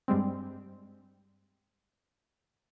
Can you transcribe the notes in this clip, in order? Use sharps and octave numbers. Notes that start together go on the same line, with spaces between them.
G2 G3 G#3 C4